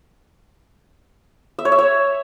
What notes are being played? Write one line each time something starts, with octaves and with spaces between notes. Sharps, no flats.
E5
C#5
E5
C#5